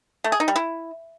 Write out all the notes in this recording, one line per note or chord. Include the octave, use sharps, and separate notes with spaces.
A3
G#4
D#4
G3
E4